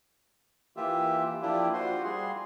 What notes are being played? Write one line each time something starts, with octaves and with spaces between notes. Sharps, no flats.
E3 A#3 F4 G4 E5
F3 A#3 D4 E4 F4 G4
F4 F#4 C5 C6
G3 G#4 C6